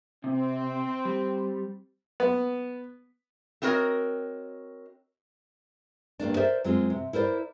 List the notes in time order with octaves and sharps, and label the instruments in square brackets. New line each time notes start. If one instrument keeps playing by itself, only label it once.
[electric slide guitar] C3 [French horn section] C4
[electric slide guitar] G3
[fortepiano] B3
[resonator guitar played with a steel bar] A3 C4 F#4 A#4 C#5 D#5
[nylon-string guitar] G2 C#3 A#3 D4
A#4 C5 D5 E5
F#2 G#3 C4 F4
C3
E4 A#4 C5 D5